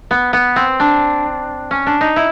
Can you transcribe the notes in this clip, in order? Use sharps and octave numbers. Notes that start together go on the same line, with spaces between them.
B3
B3
C4
D4
C#4
D4
D#4
E4